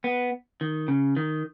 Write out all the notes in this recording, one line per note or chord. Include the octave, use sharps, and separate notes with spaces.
B3
D#3
C#3
D#3